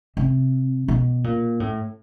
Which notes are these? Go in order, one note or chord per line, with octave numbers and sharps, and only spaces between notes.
C3
B2
A#2
A2